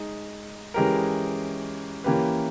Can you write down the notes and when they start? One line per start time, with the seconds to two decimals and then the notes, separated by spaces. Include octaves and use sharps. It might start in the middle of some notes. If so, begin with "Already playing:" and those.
Already playing: G#3 D#4
0.74 E3 G#3 C#4 G4 A#4
2.04 E3 A#3 C#4 G4 B4